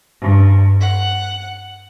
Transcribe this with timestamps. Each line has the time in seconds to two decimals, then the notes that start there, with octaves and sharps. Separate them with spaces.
0.20 G2
0.80 F#5